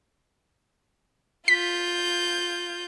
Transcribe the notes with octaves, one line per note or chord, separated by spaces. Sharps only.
F4 G6 B6